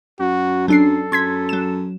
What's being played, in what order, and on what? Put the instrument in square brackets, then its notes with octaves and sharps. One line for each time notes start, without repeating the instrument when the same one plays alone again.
[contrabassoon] F#2 [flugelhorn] F#4
[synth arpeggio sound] F#3 D4 C7 [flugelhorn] A4
[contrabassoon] F#2 [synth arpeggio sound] C6 G#6 B6
[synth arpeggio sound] F#3 E7